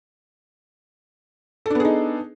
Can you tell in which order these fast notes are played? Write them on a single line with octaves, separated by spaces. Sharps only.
A4 D4 B3 G#4 D#4